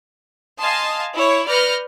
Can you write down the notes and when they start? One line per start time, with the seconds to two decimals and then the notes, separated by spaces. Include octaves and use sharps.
0.58 D#5 F5 G#5 A5 C6 D#6
1.14 E4 C#5
1.47 B4 D5 F6 G6 A#6 C#7